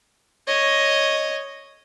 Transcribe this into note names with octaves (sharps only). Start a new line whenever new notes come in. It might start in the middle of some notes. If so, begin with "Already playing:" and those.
C#5 D#5